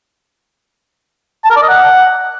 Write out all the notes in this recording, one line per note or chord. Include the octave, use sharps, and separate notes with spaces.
A5
A#4
D5
D#5
F#5